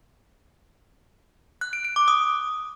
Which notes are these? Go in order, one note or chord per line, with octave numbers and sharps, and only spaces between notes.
F#6
D7
D7
D6
D#6